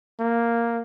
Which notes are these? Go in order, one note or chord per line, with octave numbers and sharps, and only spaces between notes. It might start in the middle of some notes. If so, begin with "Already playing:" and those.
A#3